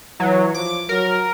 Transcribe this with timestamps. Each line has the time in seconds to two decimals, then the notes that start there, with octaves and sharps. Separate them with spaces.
0.20 E3 F#3
0.54 F3 D6
0.89 F#3 A#4